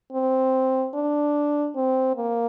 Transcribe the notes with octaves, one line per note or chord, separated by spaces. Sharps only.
C4
D4
C4
A#3